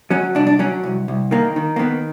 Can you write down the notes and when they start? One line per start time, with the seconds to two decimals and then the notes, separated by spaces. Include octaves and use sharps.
0.10 F#3 C#4
0.35 C2 D4
0.47 D4
0.59 F#3 C#4
0.83 C2
1.08 C2
1.31 D#3 A#3
1.56 D#3
1.76 A#3
1.79 D#3 B3